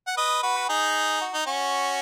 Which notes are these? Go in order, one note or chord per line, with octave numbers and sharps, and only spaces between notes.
F#5
B4 D#5
F#4 B4
D#4 G#4
F#4
D#4
C#4 F#4